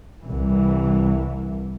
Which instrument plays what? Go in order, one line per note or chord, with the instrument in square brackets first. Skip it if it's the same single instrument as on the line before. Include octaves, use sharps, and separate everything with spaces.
[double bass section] C2 E3